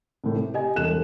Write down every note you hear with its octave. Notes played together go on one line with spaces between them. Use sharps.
C2 A2
C3
G4 D#5 G#5
E1 C2 A4 F#6 E7